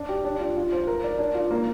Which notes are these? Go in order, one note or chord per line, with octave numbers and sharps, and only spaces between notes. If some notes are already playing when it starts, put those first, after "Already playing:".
Already playing: D4
G4
D4
F4
F4
C5
A#4
D5
D4
F4
A#3